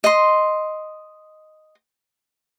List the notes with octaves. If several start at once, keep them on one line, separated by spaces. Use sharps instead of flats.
D#5 C6